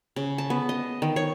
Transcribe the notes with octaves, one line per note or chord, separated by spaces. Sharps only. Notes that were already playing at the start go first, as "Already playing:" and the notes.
C#3
A5
B3
D#5
D#3
C#5